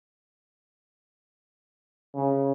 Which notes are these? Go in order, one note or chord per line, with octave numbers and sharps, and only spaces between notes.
C#3